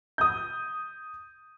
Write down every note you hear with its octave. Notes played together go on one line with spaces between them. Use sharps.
D#6 G6